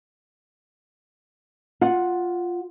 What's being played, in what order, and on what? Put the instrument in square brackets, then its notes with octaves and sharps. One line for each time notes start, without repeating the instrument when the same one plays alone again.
[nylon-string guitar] F4 F#5